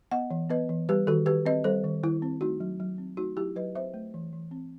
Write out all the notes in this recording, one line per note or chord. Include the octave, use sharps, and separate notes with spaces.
B3 D#5 F#5
E3
B3 B4 D#5
E3
G3 G4 B4
D#3 F#4 A4
D#3 G4 B4
C4 B4 D#5
G3 A4 C5
D#3
D#3 E4
C4
A3 D#4 F#4
F#3
F#3
C4
A3 D#4 F#4
F#3 E4 G4
F#3 B4 D#5
C4 C5 E5
A3
E3
E3
C4